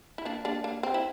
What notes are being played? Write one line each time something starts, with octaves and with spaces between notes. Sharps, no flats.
E4
A#3 D4
A#3 D4
A#3
C4
E4